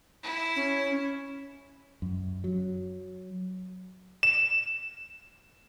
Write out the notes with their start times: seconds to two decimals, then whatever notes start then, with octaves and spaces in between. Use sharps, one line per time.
0.23 E4
0.56 C#4
2.02 F#2
2.44 F#3
4.23 E7